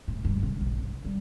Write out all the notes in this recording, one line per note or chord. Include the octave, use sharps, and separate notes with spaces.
A2
G2
C3
A#1
C#3
G3